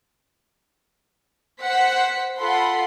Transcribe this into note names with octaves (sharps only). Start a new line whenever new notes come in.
C5 F#5 B6 C#7
F4 A4 F#5 B5 C6